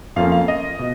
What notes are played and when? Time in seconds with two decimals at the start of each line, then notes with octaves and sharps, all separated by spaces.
0.16 F2 F3 A#3 C#4 F5
0.32 F5
0.48 D#5
0.79 B2